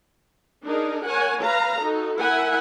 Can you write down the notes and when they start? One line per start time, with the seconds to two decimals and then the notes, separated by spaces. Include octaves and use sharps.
0.66 D4 D#4 G#4 A#4
1.06 A#4 C#5 F#5 G#5
1.43 B4 F5 A#5
1.81 D#4 F#4 A4
2.20 E4 A#4 E5 F#5 G#5